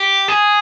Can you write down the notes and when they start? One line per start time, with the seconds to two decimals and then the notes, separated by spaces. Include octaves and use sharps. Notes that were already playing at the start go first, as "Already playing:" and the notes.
Already playing: G4
0.28 G#4